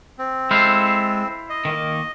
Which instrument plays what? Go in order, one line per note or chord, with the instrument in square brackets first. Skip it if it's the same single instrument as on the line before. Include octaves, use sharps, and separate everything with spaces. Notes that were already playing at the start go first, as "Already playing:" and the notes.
[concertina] C4
[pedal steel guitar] G#3 A4 [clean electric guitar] E4 C5 F5
[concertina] D#5
[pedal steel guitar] D#3 A#3